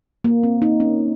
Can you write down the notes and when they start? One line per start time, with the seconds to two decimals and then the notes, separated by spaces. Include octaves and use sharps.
0.24 A#3
0.43 C4
0.62 D#4
0.80 C#4